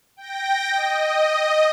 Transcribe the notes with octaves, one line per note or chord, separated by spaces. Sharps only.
G5 A#6
D#5